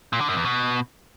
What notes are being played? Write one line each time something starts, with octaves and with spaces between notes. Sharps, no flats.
A#2
D3
F#2
E2
B2